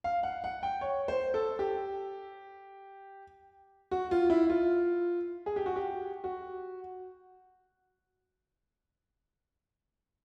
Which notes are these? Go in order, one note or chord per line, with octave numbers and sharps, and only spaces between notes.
F5
F#5
F#5
G5
C#5
C5
A4
G4
F#4
F4
E4
F4
G#4
G4
F#4
G4
F#4